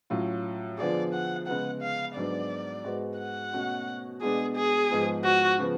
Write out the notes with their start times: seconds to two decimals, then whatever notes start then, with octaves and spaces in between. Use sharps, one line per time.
0.10 A2 F#3 C#4 F4
0.78 D3 F3 B3 F4 G#4 D5
1.13 F#5
1.47 C#3 G#3 B3 F#5
1.81 F5
2.16 G#2 F#3 B3 D4 D5
2.84 G#2 G#3 B3 F#4
3.19 F#5
3.53 B2 A3 C#4 F#4
4.22 B2 G#3 B3 D4 G#4
4.55 G#4
4.90 G#2 F3 G#3 B3
5.24 F#4
5.59 C#3 F3 B3